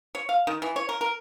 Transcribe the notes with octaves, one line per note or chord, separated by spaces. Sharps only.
C#5
F5
D#3
E3
C#5
A#4
A#4